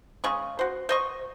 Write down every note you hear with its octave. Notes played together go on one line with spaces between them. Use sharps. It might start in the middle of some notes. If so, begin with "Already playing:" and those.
C#3 G#3 C#6
F#4 C5
C5 D#5 C#6